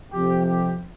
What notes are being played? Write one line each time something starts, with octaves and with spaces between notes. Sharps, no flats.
F2 C3 F3 G4
G4